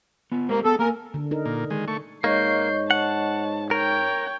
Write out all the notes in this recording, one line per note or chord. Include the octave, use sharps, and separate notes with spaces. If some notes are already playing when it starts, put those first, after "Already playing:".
B3 F4
G#3 A#3 G4 C5
B3 G#4 A4
A#3 A#4 G#5
D3
D#4 A#4
A#2
D#3 G#3
A3 C#6
G#2 A#3 C#5 D#5 C#6 G6 C7
F#5 A5
A#4 C#5 G5